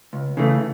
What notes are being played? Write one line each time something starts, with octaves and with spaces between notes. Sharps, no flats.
C#2
C#3 E3 A3